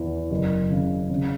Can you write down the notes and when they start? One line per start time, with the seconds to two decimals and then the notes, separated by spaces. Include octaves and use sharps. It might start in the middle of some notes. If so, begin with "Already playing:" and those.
Already playing: E2 E3
0.30 F#1
0.70 C#3
1.09 C#3